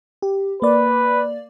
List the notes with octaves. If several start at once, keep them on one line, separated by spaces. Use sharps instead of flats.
G4
A#3 B4 D5